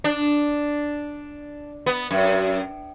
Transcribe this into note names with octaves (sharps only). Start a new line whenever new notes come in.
D4
B3
F#2